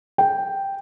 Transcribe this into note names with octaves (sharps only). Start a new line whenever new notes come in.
G5